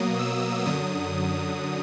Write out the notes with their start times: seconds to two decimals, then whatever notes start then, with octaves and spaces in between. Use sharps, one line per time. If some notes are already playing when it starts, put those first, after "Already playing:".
Already playing: B2 F#3 A#3 D#6
0.19 E6
0.65 F#2 D3 F#3 D#6